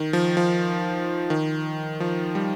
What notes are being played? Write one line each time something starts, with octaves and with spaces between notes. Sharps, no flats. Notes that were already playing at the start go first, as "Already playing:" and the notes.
Already playing: D#3
F3
F3
D#3
F3
G3